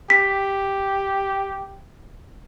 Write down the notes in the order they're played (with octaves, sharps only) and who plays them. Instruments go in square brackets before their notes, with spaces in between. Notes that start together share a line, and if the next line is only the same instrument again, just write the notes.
[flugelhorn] G4 [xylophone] B6